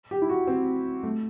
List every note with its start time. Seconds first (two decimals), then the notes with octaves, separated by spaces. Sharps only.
0.11 G4
0.22 E4
0.29 F#4
0.47 C4
1.03 A3